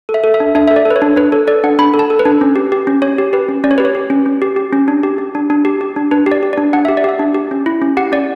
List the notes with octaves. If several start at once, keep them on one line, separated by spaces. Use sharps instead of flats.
A4
E5
A4
E5
D4
D4 E5
A4 E5
D5
A4
B4
C#5
D4
D4 B4
A4 C#5
A4 D5
D4 F#5
D4 B5
A4
A5
A4
B4
D4
C#4
G4
G4
C#4
C#4 C#5
G4
G4 B4
C#4
C#4 D5
C#5
G4 B4
C#5
G4
C#4
C#4
G4
G4
C#4
D4
G4
G4
D4
D4
G4
G4
D4
D4 B4
G4
D5
G4
D4 D5
D4 F#5
G4 E5
D5
G4 E5
D4
G4
C#4
E4
C#4
G4 F#5
C#4 D5